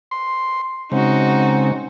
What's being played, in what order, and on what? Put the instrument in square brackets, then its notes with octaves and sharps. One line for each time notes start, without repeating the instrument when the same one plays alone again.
[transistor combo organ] C6
[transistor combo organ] C#3 G#3 C4 [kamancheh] D#4 F#4